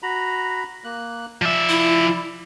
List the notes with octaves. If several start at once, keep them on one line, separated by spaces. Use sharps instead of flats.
F#4 A#5 B5
A#3 F#6
F3 D5 E5
E4